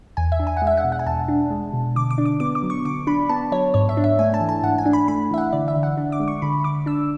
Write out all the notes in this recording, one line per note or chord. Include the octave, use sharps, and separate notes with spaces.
E2 G#5
E5
D4
G#5
F#5
G#3
E5
F#5
B2
F#5
G#5
E2 A5
D4
G#3
B2
D3 D6
D6
D4
D6
B3 D6
D6
F#3
C#6
D3 D6
D4 B5
B3 A5
F#3 C#5
G#2 C#5
E5
D4
E5
A3 G#5
A5
E3
A5
G#2 F#5
G#5
D4
B5
A3 B5
E3 E5
F#5
D3 D5
E5
D3
F#5
D4
D6
G#3
C#6
D3 B5
D3 D6
D4 E6